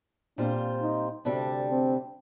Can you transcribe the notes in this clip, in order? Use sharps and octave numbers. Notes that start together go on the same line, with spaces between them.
A#2 G3 C4 D4 F4 C5
D#4
D2 C3 G3 D4 A4
C4